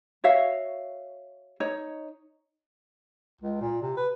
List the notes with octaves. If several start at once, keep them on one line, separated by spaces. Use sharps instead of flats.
F#4 C#5 E5 F5
D#4 C#5
C#2
A#2
C3
B4